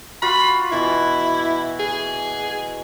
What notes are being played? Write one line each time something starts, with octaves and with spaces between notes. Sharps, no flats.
F4 F#4 F5 B5
B2 E3 E4
G#4